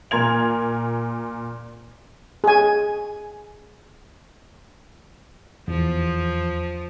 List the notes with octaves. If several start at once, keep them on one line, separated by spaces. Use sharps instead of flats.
A#2 A#4 C6 G#6 F7
G#4 G#5
E2 F3